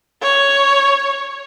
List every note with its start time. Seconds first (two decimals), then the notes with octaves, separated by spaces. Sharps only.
0.22 C#5